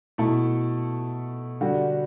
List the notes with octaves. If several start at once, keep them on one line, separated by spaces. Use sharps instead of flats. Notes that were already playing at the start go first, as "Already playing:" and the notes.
B2 A3 E4 A4
D3 G3 D4 F#4